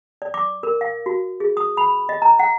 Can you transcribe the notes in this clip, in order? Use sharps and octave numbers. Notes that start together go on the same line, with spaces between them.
D5
D6
A#4
F5
F#4
G#4
D#6
B5
D#5
A#5
F#5